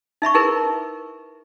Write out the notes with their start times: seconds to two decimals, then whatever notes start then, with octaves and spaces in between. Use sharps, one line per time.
0.22 D#4 E5 B5 C#6
0.34 D#4 E4 G#4 A#4 B4